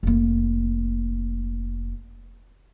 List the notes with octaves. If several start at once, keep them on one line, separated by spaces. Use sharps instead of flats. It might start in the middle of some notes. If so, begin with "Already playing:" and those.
F1 A#3